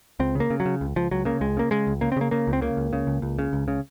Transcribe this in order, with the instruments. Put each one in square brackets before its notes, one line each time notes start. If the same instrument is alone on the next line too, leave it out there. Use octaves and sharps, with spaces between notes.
[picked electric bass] C#2 C4
C#3 A#3
C#3
F#3
C#3
C#2
C#2 F3
C#2 F#3
C#3 A#3
C#2 G#3
C#3 A#3
C#3 G#3
C#2
C#3 A#3
C4
C#3 A#3
C#3 A#3
C#2
C4
C#3 A#3
C#2
C#3
C#2
C#2
C#3
C#2
C#3